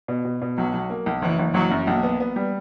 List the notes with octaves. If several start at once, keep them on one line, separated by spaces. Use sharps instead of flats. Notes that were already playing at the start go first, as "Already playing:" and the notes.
B2
B2
B2
B1 F#3
B1
A#3
B1
F#1 E3
F#1
F#1 F#3
F#2
B1 A#3
B3
B3
G3